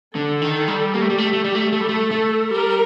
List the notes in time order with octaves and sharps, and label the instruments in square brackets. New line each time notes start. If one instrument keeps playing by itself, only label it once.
[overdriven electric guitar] D3 [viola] A4
[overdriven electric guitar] D#3
G3
[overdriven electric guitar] A#3 [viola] G4
[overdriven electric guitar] A3
G3
A3
A3
G3
A3
[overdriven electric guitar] A3 [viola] A4
[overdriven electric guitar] G3
A3
A3
[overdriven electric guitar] G3 [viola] A#4